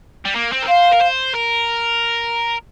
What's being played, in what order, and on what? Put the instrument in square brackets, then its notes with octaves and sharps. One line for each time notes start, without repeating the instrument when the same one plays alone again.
[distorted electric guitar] G3
A#3
C4
A#4
[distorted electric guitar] C5 [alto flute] F5
[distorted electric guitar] A#4
C5
A#4